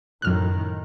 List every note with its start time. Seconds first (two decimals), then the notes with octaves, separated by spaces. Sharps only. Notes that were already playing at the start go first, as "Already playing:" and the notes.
0.22 F#2 A2 D#3 F6 F#6